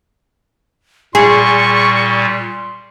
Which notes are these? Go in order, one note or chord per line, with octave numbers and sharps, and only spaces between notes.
A#2 G3 G#4 C6 C#6